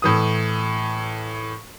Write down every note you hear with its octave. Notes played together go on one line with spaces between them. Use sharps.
A2 E3 D#6